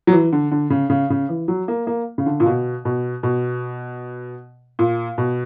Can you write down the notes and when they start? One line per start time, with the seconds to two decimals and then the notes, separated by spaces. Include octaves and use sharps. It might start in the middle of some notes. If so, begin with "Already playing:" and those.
0.07 F#3
0.12 E3
0.32 D3
0.51 D3
0.70 C#3
0.90 C#3
1.10 C#3
1.29 E3
1.48 F#3
1.68 A#3
1.87 A#3
2.18 C#3
2.26 D3
2.40 A#2
2.46 B2
2.85 B2
3.23 B2
4.79 A#2
5.18 B2